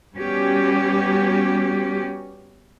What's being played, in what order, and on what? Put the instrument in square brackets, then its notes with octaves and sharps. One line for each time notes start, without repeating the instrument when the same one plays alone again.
[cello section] G3 B3 C#4 F#4 G4